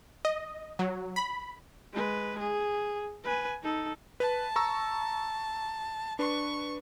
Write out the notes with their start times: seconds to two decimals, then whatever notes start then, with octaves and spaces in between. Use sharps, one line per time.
0.25 D#5
0.79 F#3
1.16 B5
1.92 G#3 B4
2.39 G#4
3.24 B4 G#5
3.62 D#4 A4
4.20 B4 A5
4.56 A#5 C#6 E6
6.19 D4 B4 C#6